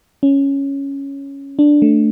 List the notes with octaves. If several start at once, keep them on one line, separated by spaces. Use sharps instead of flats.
C#4
D4
A3